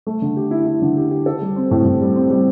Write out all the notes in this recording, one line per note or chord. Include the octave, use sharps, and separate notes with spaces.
A3
D3
G4
E4
E4
D3
G4
G4
A4
G3
C4
A2
A2
G3
C4
G3